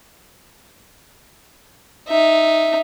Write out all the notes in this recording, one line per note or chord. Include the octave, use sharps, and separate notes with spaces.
D#4 E5